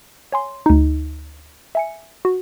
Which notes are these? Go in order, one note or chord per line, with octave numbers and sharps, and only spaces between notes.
C#5 G#5 C6
D2 D#4
E5 G#5 C#7
F#4